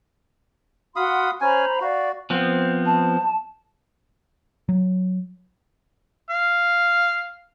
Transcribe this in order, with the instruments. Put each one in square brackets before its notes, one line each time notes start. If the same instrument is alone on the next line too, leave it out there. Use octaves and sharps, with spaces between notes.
[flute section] F#4 F#5 C6 [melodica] F5 B5 D#6
[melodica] C#4 G#5 [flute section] C5 A#5 B5
[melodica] F#4 [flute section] D5 F5
[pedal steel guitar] F3 B3 C4
[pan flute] A5
[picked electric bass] F#3
[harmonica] F5